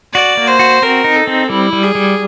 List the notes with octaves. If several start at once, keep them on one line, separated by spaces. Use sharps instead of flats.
F#4 D5
A#3
C5
F#4
C4 A#4
D#4
A4
C4
G3 E4
G3
G#4
G3